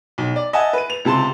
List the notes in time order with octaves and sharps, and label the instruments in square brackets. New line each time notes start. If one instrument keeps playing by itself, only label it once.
[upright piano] B1
D5
D#5 E5 F#5 G#5 A5
B4 D#7
F7
C#2 C3 A5 C6